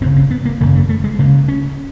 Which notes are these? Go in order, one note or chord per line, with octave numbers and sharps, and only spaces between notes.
G#1 F#2 C#3 C4
C4
B3
A#3
G#1 F#2 C#3 A#3
A3
A3
G#3
D2 C#3 A#3
C#4